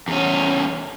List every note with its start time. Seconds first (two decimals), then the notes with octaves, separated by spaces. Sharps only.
0.08 E2 C#4